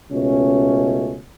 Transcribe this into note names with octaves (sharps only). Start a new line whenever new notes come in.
C#2 B2 A3 C#4